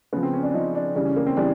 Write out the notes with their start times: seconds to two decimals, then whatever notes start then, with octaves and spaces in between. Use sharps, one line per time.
0.13 C#3 F3 B3
0.23 C4
0.34 C#4
0.43 D4
0.54 C#3 F3 D#4
0.75 D4
0.96 C#3 E3 G3 D4
1.05 C#4
1.16 A#3
1.26 C4
1.37 C#3 E3 G3 D4